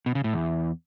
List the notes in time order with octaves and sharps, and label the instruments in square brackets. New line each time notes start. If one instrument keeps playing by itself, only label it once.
[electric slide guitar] B2
C#3
A2
E2